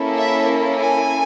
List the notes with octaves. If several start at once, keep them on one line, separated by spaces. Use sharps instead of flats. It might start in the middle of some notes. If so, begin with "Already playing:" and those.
Already playing: A#3 C#4 E4 A4
E5
G#5